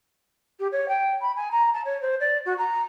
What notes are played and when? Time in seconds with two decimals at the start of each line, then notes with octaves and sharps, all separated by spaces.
0.60 G4
0.72 C#5
0.88 G5
1.21 B5
1.36 G#5
1.51 A#5
1.74 A5
1.85 C#5
2.02 C5
2.20 D5
2.46 F#4
2.58 A#5